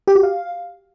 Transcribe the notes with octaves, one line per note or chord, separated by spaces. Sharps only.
G4
F#4
F5